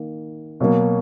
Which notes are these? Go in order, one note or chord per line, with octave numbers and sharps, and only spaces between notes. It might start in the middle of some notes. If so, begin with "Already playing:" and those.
Already playing: D#3 A#3
B2 F#3 A#3